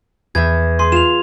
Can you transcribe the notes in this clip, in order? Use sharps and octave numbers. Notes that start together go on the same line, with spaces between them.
E2 E5 G#6
G#4 C6
F4 E7 F7